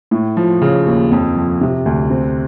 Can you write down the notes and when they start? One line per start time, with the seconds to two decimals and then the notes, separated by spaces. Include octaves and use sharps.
0.11 A2
0.37 F3
0.62 C#3
0.86 D#2
1.12 F2
1.36 F3
1.61 C3
1.86 D2
2.10 C4